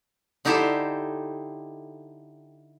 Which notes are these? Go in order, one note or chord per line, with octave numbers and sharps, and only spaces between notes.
D3 D#4 E4 G4 A4 C5